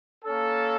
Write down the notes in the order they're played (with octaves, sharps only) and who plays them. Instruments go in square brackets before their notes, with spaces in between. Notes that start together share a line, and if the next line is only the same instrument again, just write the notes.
[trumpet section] A#3 C#4 A4